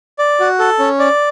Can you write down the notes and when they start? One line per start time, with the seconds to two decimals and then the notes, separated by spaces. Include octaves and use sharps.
0.19 D5
0.40 F#4
0.59 A4
0.79 C#4
0.99 D5